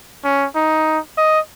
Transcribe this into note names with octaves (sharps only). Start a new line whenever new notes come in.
C#4
D#4
D#5